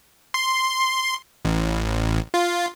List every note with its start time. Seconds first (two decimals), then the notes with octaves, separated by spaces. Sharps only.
0.34 C6
1.45 A1
2.34 F4